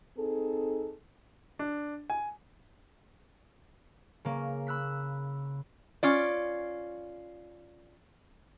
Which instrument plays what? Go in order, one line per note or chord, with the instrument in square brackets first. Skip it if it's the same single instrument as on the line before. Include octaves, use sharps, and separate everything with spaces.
[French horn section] C4 D#4 G#4 A4
[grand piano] D4
G#5
[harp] C#3 A#3
B5 E6 F#6 B6
[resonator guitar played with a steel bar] C#4 F4 D5